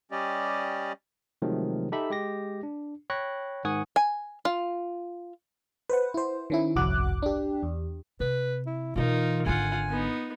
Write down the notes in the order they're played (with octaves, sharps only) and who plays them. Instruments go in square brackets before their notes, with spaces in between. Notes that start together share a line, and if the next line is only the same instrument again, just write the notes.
[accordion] G3 C#4 G4 D5 D#5
[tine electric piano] C3 D#3 F3 F#3 G#3 A3
D#4 G4 A4 E5 B5
G#3 G4 A#6
D4
C#5 G5 B5 C#6 F#6 A#6
G#2 D#3 F#5 G#5 C#6 D#6
[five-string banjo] G#5
F4
[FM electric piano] B4 C5 F#5
E4 C5
D#3 C#4 E4
G1 C2 F2 F#4 D6 F#6
D4 G4
E2
[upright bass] C3 [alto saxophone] B4
[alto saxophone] E4
[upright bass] B2 E3 [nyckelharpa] D#4 A#4 [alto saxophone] F4
[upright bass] G#1 D3 [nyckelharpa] F4 F#5 [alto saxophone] G#5
[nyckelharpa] B3 D#4